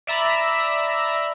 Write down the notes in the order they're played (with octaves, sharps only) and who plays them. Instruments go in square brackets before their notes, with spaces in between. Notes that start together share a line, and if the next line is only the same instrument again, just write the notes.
[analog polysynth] D5 E5 A#5 B5